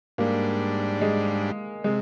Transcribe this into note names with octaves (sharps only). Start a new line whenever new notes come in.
G#2 G3 A#3 D4
G#3
C3 G#3